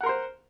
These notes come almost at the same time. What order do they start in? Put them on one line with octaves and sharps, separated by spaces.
F#5 A#4 C6 C5